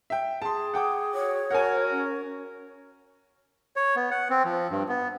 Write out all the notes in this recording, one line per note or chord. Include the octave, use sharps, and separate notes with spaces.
E5 G5
G#4 A5 C6
F#5 G5 D6
F#4 C#5
F#4 A#4 F#5 G#5
C#4
C#5
B3
F#5
C4
F3
G2
B3